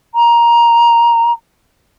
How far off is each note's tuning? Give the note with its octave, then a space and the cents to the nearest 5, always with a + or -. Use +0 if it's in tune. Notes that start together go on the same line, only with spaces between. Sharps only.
A#5 +15